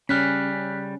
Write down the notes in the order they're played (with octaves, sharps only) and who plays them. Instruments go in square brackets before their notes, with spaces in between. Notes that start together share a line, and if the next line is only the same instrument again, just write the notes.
[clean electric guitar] C#3 G3 [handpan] C#4 [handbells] F6 F#6 B6